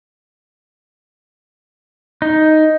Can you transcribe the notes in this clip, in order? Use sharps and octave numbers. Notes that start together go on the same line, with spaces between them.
D#4